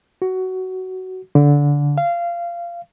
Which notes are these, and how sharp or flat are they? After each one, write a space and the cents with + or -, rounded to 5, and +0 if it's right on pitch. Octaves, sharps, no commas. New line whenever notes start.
F#4 +15
D3 -20
F5 -20